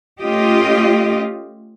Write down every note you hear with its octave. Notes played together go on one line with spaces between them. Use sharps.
A3 C#4 F4 G4 D#5